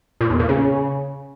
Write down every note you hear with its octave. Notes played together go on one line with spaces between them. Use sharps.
A#2
E2
A#2
C#3